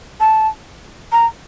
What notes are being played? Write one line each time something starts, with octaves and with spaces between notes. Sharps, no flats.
A5
A#5